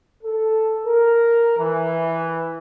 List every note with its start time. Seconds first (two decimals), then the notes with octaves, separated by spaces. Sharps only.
0.24 A4
0.87 A#4
1.59 E3